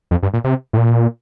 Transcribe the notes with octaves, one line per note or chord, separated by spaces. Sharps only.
F2
G2
A#2
C3
A2
A#2